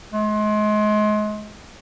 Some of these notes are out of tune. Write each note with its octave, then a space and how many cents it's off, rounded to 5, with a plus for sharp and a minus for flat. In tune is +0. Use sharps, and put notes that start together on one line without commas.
G#3 +35